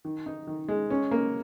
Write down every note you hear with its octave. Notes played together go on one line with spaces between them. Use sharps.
D#3
D#4
D#3
G#3
C#4
A#3